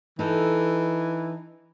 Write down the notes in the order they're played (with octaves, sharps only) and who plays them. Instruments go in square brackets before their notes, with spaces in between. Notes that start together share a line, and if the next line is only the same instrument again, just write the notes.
[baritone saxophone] E3 [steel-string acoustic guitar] D#4 A4